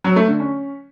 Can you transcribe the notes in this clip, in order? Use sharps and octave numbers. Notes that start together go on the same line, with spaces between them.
F#3
A3
D3
C#4